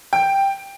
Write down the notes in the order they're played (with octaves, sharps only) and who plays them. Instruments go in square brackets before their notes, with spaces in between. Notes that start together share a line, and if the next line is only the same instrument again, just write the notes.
[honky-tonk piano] G5